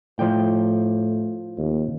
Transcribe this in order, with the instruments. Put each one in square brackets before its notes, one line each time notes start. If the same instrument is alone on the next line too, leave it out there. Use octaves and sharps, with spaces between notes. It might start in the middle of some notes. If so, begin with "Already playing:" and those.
[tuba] A2 [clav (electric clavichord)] F3 D5 G5
[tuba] D#2